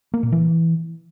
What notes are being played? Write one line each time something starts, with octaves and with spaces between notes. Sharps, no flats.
A#3
A#2
E3